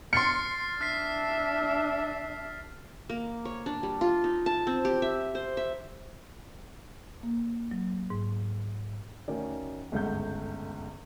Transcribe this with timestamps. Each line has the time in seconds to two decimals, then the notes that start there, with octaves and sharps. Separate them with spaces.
0.13 C6 F6 A6 C7 C#7
0.81 D4 E5 F6 B6 C7
3.10 A#3
3.45 C#5
3.66 D4
3.83 G3
4.01 F4
4.24 D#4
4.46 A5
4.67 C4
4.85 G4
5.02 E5
5.35 C5
5.57 E5
7.23 A#3
7.71 F#3
8.10 G#2
9.28 D2 D#3 C#4 F#4 D5
9.92 G1 C#2 G#2 A3 F#5 G6